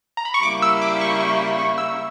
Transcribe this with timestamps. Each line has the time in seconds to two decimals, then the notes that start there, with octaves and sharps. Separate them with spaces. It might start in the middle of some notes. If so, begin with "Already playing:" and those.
0.17 A#5
0.25 B5
0.34 C#6
0.43 C#3 G3 A#3 E4 D6
0.62 E6
0.82 D6
1.01 C#6
1.21 C#6
1.59 C#6
1.78 E6